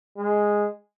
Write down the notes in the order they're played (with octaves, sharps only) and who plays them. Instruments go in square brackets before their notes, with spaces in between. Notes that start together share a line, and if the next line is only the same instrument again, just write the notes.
[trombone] G#3